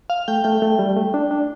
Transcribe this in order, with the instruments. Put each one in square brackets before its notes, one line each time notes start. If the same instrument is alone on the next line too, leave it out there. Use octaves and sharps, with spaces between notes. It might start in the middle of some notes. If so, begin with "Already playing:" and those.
[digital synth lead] F5
[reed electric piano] A3 [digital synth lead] G5
[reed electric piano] A3 [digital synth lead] G5
[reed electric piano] A3
G3
A3
D4
D4